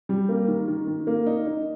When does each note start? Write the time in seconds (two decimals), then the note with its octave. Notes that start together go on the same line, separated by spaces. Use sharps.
0.09 G3
0.29 A#3
0.48 D#3
0.68 D#3
0.87 D#3
1.07 A#3
1.26 D#4
1.46 D#4